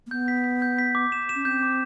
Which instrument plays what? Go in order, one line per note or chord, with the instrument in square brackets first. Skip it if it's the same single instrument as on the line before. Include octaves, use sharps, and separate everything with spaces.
[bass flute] A#3
[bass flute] B3 [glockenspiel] G6
[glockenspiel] B6
B6
G6
B6
D6
E7
E7
[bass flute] C#4
[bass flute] C4 [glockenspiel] G6
[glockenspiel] D6